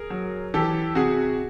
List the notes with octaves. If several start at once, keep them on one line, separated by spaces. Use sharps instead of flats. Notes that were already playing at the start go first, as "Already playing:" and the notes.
Already playing: G#4 A#4
F#3
E3 G4 A4
C3 F#4 G#4